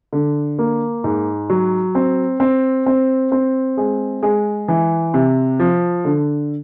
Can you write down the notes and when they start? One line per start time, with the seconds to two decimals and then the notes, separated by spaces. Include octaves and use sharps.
0.13 D3
0.59 A#3
1.04 G#2
1.50 F#3
1.95 C4
2.40 C4
2.86 C4
3.32 C4
3.77 G#3
4.23 G#3
4.68 E3
5.14 C3
5.59 F3
6.05 D3